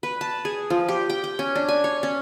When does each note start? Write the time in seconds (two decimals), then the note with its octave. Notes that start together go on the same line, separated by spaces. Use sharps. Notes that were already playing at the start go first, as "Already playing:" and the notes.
0.03 B4
0.21 A5
0.45 G#4
0.70 F3
0.89 G4
1.10 G5
1.24 G5
1.39 C#4
1.55 D4
1.68 G#5
1.84 C#5
2.03 C#4